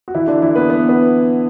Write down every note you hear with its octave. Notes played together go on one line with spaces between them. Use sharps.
F#4
E3 E4
D3 D4
E3 E4
B3 B4
B3 B4
B3 B4